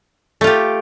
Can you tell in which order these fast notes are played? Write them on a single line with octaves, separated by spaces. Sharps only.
A3 F4 G4